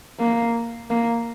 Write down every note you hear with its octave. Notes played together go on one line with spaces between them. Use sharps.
A#3
A#3